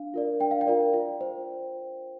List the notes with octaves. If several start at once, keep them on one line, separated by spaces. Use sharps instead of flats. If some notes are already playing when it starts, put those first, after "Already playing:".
Already playing: D4 F5
F4 A#4 D5
D4 G5
F5
G5
F4 A#4 D5
F4
C5